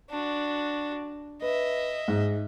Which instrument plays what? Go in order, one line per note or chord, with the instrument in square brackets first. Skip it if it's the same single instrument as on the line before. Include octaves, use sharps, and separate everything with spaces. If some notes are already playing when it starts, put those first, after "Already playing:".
[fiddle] D4 F#4
[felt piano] B4 [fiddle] D#5 E5
[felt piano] G#2